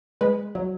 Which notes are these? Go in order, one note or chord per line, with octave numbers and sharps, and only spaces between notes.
G#3 B4
F#3